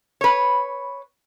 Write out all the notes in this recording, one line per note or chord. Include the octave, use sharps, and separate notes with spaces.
B4 C#5